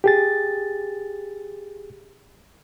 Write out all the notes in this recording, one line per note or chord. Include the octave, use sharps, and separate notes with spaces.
G4 G#4 A6